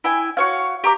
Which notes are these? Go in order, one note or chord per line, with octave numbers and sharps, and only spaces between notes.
E4 G5 G#5
F#4 C#5 F5
G4 A#5 D6